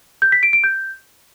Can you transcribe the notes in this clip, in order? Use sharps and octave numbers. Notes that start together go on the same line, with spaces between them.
G6
B6
D7
D7
G6